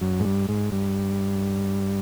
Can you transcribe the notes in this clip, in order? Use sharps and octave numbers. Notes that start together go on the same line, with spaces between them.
F#2
G#2
G2
G#2
G2